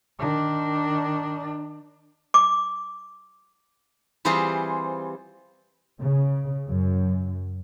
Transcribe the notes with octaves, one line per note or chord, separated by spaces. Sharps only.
D#3 D4
D6
E3 G3 C4 F4 G#4 C5
C#3
F#2